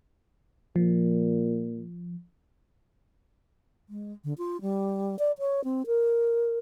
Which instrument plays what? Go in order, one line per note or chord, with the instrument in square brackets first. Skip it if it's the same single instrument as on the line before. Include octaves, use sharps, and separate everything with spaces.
[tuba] A#2 [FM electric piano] F3
[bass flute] G#3
D3
F4
G3
D5
C#5
C4
A#4